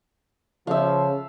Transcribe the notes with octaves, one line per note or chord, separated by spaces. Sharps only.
C#3 F3 E5 F5